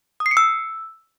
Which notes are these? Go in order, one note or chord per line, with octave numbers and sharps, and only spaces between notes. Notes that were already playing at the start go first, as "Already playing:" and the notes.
D#6
C7
C#7
E6